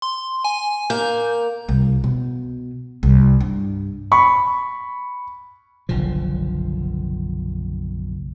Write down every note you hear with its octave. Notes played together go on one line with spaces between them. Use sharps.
C6
G#5
A#3 G6
C2
B2
C2
G2
B5 C#6
F#1 B1 D3 F3